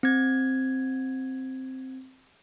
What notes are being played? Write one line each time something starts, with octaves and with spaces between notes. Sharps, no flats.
C4 G#6